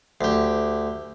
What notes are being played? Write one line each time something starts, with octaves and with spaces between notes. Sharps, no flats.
D2 G4